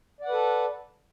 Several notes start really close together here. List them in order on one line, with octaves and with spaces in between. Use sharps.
D5 F#5 B4 A4